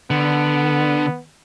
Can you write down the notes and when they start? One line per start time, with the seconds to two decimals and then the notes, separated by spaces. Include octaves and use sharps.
0.11 D3 B3